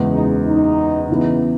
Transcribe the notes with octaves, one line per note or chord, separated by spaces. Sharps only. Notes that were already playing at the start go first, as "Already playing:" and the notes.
Already playing: F#1 E2 C#3 G#3
D#4
D#4
C#3 E3 B3